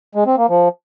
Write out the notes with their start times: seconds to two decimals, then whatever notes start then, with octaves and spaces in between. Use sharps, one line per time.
0.15 G#3
0.26 C4
0.38 A#3
0.49 F3